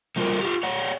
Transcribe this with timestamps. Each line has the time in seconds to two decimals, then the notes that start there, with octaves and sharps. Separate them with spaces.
0.16 D3 G3 C4 F4 F#4 A#4
0.40 F4 G4
0.63 C#5 D5 F#5